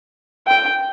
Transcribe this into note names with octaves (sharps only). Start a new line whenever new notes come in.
G5